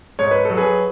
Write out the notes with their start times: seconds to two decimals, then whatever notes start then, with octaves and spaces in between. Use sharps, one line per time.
0.19 G#2 C#5
0.31 B4
0.45 F#3 A4
0.57 G#4 B4